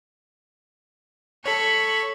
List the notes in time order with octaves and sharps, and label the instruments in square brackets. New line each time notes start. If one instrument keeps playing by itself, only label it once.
[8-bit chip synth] A4 C#5 [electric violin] B5 C#6